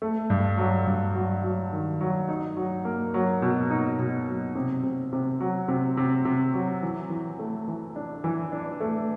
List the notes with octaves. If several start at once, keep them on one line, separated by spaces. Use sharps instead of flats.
A3
G2
F#3
G2
F#3
F#3
D#3
F#3
D#4
F#3
A#3
F#3
B2
D#4
B2
F#3
C3
C3
C3
F#3
C3
C3
C3
F#3
E3
E3
A3
E3
D4
E3
D4
A3